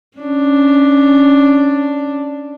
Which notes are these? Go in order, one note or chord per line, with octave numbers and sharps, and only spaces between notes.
C#4 D4